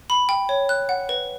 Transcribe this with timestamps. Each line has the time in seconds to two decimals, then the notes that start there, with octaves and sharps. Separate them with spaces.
0.10 B5
0.29 G5
0.49 C#5
0.69 F#6
0.89 F#5
1.09 B4